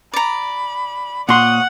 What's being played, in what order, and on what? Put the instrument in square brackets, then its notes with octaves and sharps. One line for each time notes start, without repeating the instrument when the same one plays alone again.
[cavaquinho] D5 A#5 [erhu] B5
[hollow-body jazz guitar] A#2 C6 [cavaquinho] C#5 [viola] F#5 [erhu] D#6